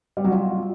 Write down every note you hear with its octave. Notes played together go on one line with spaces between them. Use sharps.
G3
F#3
F4